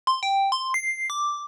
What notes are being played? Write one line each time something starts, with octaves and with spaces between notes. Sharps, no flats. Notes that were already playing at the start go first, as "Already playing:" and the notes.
C6
G5
C6
C7
D6